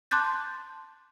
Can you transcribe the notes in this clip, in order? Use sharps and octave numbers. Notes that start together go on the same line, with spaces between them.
A5 C6 D6 F#6 G6 A6